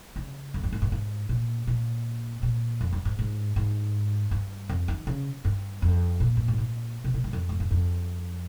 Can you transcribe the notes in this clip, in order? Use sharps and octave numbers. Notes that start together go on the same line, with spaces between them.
C#3
F2
G2
G#2
G2
G#2
A#2
A#2
A#2
F2
G2
G#2
G#2
G#2
G2
F2
D#3
C#3
G2
F2
A#2
G2
G#2
A#2
C3
A#2
G2
F2
G#2
G2
F2